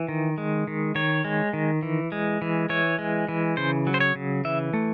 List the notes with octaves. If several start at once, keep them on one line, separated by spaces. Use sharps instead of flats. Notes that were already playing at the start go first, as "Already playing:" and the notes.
Already playing: E3
D#3
G#3
D#3
D#3 C#5
G#3
D#3
E3
G#3
E3
E3 C#5
G#3
E3
C#3 C5
F#3
C5
C#5
C#3
E3 E5
A3